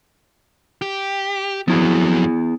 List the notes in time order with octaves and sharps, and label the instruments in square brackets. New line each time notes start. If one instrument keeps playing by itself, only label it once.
[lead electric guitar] G4
[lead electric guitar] F2 F#3 [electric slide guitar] B3 E4 G#4